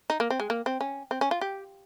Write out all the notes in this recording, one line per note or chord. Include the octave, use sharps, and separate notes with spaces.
D#4
A#3
C4
G#3
A#3
C4
C#4
C4
C#4
F4
G4